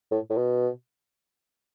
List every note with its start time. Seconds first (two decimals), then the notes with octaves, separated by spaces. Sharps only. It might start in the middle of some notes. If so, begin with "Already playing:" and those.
0.11 A2
0.30 A2
0.37 B2